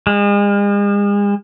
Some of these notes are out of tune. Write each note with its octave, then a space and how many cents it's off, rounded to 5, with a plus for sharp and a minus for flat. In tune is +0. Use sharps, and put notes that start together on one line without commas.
G#3 -40